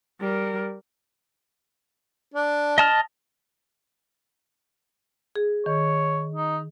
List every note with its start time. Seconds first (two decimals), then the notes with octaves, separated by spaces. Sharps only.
0.20 G3 A#4
2.34 D4
2.78 D#5 A5 F6
5.36 G#4
5.66 D#3 C#5
6.35 D#4